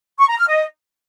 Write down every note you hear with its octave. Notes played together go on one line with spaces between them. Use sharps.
C#6
A#5
F6
D#5